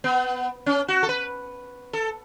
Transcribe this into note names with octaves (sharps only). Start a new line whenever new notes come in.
B3
C#4
F#4
A4
B4
A4